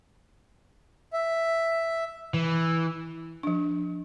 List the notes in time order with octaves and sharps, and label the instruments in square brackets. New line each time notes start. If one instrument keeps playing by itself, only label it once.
[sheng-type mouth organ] E5
[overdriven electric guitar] E3
[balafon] F3 D4